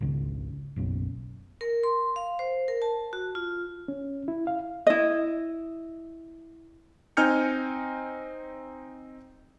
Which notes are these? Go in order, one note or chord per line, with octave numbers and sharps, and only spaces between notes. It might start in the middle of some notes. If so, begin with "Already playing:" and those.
G#1 C#2 C#3
F#1 B1 F#2 C#4
A#4
C6
F5
C5
A#4
A5
F#4
F4
C#4
E4
F5
E4 D#5
C4 D#4 G#5 F6 G6 C#7